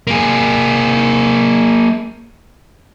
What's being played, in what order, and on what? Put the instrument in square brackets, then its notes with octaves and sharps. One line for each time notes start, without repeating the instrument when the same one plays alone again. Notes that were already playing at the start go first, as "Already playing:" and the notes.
[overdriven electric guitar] A#3 G#4